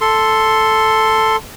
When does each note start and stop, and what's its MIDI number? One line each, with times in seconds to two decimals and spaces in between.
0.01 1.36 69
0.01 1.36 84